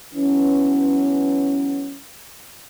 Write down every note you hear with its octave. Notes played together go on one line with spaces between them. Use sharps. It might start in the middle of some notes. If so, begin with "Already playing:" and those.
E3 F#3 B3 C#4